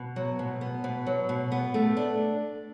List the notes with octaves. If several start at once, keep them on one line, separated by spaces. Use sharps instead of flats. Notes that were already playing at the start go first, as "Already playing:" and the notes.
Already playing: B2
F#3
B2
B3
B2
F#3
B2
B3
A3
D4